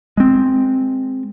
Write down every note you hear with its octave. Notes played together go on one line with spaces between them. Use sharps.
G#3 C4